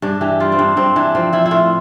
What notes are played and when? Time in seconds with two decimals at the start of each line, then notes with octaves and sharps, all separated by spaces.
0.02 G2 D4
0.21 E3 G4
0.40 G3 F4
0.52 C4
0.59 G2 D4
0.77 G2 C4
0.96 E3 D4
1.15 F3 C4
1.33 F3 E4
1.46 E4
1.51 A2 F4